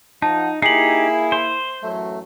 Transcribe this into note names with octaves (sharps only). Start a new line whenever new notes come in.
F3 D#4 F#5 A5
A#3 D#4 E4 G4 G#4 C7 F#7
C5
A1 F#2 F#3 A3